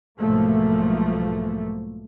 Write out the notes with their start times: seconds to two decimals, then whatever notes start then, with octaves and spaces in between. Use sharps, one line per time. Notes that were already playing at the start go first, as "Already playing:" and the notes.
0.19 B1 G#2 F3 A3 A#3